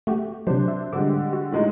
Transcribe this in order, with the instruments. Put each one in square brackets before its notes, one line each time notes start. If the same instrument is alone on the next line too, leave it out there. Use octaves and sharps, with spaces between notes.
[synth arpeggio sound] A3 F#4 G4
[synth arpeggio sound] C3 F#3 [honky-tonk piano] D4 C5
[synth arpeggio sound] E5
[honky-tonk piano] D3 G3 G#3 [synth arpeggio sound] D6
[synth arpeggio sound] F#4
[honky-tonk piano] A2 G#3 D#4